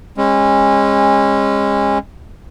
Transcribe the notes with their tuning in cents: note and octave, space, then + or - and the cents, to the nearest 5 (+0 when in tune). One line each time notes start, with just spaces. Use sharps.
G#3 -25 C#4 -30